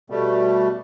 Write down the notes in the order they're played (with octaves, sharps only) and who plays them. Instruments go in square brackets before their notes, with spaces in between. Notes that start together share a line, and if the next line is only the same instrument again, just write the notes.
[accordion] B2 G3 A3